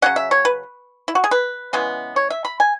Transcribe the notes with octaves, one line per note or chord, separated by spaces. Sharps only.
C#3 F#3 C#4 F#5
E5
C#5
B4
E4
F#4
G#4
B4
C#3 E3 G#3 B3
C#5
E5
B5
G#5